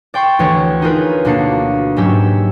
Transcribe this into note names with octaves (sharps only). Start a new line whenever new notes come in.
D5 G5 C6 C#6
D2 E3 C#5
D#4 F4 G#4 A#4 B4
D2 B2 A#3 D4 F5 C#7
G#2 F#3 C#4 G4 E6